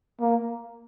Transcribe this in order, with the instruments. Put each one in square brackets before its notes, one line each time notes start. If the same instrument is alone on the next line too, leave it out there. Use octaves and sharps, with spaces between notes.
[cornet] A#3